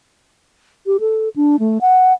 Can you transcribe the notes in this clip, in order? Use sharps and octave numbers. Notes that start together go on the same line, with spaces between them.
G4
A4
D4
A3
F#5